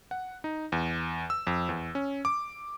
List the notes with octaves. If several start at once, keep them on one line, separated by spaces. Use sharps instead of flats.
F#5
D#4
E2
E6
F2
E2
C#4
D6